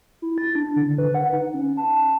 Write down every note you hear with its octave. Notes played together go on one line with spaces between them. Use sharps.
E4
A6
D4
D3
B4
F#5
D#4
C#4
A5